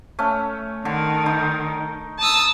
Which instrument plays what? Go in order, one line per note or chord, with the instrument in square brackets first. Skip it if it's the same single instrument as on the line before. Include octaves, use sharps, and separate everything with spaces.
[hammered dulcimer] A3 C#4
[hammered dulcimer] D3 [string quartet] D#3
[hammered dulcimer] D#4
[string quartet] A5 D#6 E6